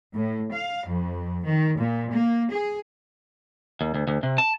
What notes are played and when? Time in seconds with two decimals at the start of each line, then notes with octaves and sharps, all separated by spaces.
0.14 A2
0.51 F5
0.87 F2
1.44 D#3
1.78 A#2
2.12 A#3
2.50 G#4
3.81 D#2
3.94 D2
4.07 D2
4.23 C3
4.38 A5